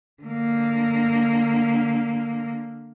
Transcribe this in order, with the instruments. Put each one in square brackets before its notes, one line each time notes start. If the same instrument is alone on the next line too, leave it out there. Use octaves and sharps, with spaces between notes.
[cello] D3 A#3